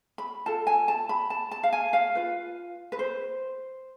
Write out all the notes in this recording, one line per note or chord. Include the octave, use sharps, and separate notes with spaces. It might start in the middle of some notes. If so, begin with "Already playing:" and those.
B5
F4 A4 A5
G#5
A5
B5
A5
A5
F5
G#5
F5
F4 B4
B4
C5